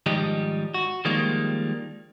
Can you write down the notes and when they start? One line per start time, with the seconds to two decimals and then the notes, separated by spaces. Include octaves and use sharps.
0.06 G#2 D#3 F3 G3 G4 D#5
0.74 F#4
1.05 D#3 F3 G3 G#3 A#3